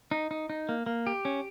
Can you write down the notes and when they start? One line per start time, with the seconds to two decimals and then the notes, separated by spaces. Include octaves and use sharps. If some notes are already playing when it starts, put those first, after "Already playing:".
0.11 D#4
0.31 D#4
0.50 D#4
0.69 A#3
0.86 A#3
1.07 G4
1.25 C#4